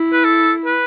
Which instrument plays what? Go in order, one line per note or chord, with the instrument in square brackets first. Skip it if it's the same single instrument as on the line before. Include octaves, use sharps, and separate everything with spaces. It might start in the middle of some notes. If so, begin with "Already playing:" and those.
Already playing: [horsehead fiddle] E4
[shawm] B4
A4
B4